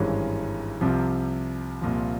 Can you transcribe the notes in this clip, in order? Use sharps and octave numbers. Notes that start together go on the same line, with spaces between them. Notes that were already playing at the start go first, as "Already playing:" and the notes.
Already playing: G#1 G2 E3 G#3 C#4
C2 C3 F3
C2 A#2 F3